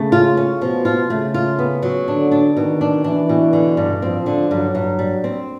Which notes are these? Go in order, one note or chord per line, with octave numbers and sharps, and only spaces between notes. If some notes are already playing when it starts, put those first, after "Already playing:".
Already playing: C#3 A3
F4
C#4
B2 F3
F4
C#3 A3
F4
B3
F#3
D3 D4
D4
B2 D#3
D4
E3 D4
B2
D3
G2
F3 C4
D3
G2 F#3
G2
G3
C4